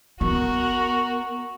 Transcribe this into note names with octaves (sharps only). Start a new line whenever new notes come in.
B3 F#4 A#4 C#6